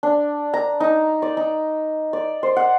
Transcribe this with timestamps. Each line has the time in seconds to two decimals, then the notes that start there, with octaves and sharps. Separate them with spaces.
0.03 D4
0.54 A#5
0.80 D#4
1.22 D5
1.37 D#4
2.13 D5
2.43 C5
2.56 F#5